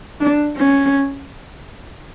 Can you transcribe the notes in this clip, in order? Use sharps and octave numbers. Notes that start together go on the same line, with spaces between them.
D4
C#4